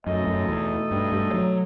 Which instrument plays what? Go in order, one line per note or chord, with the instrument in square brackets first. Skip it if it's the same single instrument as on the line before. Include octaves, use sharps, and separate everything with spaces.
[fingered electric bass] F#2 [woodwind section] B2 A3 D#4 A4 D#5
[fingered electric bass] F#2
E2
G2
G2
F#3